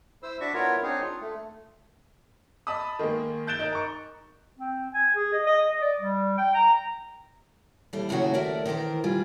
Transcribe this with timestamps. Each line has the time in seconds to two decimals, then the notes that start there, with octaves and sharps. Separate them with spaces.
0.23 E4 C5 E6
0.40 D4 F#4 D5 E5 C#6
0.54 B3 E4 F4 A#4 C#5
0.83 C4 D4 D#4 G#4 C#5
1.02 F4
1.21 A3
2.67 D#5 A5 B5 D#6
2.99 D#3 G#3 A#3
3.47 F#6 G6 A6 D7 E7 G7
3.59 D#4 A#4
3.72 A#5 C#6
4.58 C4
4.94 G#5
5.15 G#4
5.33 D#5
5.47 D#5
5.68 D#5
5.81 D5
6.00 G3
6.38 G5
6.55 A#5
7.93 D#2 E3 G3 A4 F5
8.09 D#2 A2 C#3 F#3 F#4
8.34 D#2 D#3 A3 A#4 D5 E5
8.66 D#3 E3 A4 A#4 C5
9.04 D2 G3 F4 G#4